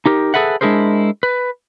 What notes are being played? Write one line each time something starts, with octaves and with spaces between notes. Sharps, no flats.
D#4 G4 A#4
G#4 A4 B4 E5 F#5
G#3 D4 E4 G#4 A#4 C5
B4